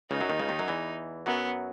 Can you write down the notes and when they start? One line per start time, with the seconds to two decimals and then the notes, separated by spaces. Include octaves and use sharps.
0.10 C#2 C#3 D#4
0.20 F#2 F#3
0.30 D#2 D#3
0.39 C#2 C#3
0.49 D#2 D#3
0.59 F#2 F#3
0.68 E2 E3
1.26 F#2 F#3 B3